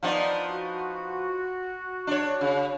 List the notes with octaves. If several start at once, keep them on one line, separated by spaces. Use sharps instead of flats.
F3 B3 D#4 D5
F#4
D4 C#5
C#3